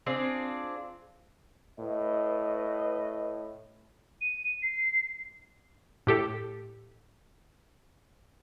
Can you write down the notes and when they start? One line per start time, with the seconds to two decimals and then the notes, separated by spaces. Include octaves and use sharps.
0.06 C4 D4 F4 G#4
1.79 A2 B4 D#5
4.21 D#7
4.62 C7
6.07 A2 G4 A4